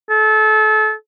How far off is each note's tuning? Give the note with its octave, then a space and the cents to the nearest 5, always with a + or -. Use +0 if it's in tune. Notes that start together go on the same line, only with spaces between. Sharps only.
A4 -30